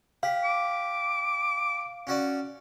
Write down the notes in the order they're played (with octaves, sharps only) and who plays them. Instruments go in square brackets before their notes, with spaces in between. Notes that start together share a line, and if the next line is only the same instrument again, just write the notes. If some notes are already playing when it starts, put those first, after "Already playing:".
[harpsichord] G4 [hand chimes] F5
[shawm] D6
[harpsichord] C#4 F#4 D5